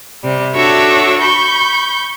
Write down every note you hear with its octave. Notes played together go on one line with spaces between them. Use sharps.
C3 G3
D4 F#4 A4 C#5 E5
B5 C#6 G6